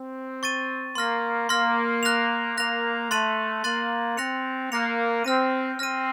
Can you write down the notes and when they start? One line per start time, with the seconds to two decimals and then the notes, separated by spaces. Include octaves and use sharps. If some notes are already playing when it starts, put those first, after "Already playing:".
Already playing: C4
0.43 C#6 A6 D#7
0.95 A#3 C6 F6 A#6
1.49 A#3 C6 F6 A#6
2.03 F#6 A#6 F7
2.57 A#3 F#6 A#6 F7
3.10 A3 C6 F#6 A6 D#7 F#7
3.64 A#3 C6 F#6 A6 D#7 F#7
4.17 C4 F#6 A#6 C#7 F7
4.71 A#3 F#6 A#6 C#7 F7
5.24 C4 F6 A#6 D#7
5.79 C4 F6 A#6 D#7